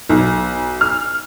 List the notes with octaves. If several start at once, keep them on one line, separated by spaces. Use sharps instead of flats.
B1
F6